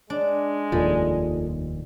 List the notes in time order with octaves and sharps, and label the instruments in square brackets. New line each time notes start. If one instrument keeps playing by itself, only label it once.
[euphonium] G#3 [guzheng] D4
[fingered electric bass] F1 D#2 A#2 [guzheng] G3 [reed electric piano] F4 A4